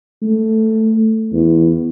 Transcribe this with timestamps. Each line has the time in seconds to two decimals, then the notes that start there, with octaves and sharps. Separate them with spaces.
0.22 A3
1.32 E2